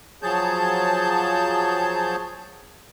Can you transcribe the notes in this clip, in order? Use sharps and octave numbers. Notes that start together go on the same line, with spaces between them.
F3 F#3 G#4 C#5 A5 G6